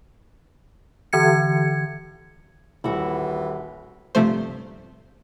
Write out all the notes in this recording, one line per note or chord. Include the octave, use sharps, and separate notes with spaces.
D3 E3 G#6 C#7
D#1 E3 E4 F#4
G1 C3 F3 A3 C5